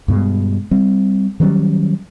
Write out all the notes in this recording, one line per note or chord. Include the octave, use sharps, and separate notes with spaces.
G2 B2 G#3
G3 C4
D#3 F#3 G3 C#4